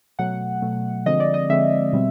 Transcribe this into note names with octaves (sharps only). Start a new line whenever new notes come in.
B2 F#3 A3 F#5
B2 F#3 A3
D3 F3 G#3 C4 D#5
D5
D#5
D3 F3 G#3 C4 E5
B2 G3 C4